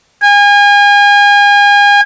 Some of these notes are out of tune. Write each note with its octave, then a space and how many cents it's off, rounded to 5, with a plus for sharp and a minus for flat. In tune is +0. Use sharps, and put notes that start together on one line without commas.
G#5 -35